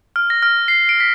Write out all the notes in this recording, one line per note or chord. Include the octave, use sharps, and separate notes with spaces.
F6
A#6
F6
C7
D7
B6